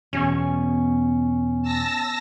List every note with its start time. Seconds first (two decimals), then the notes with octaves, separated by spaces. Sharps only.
0.13 E2 B2 C#4 G#5 C#6
1.62 A5 E6 A#6